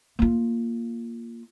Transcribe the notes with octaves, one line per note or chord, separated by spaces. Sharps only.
A#3 F4